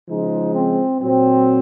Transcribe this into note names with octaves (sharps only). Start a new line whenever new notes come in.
C#3 F3 G#3 D#4
C4
A#2 F#3 C4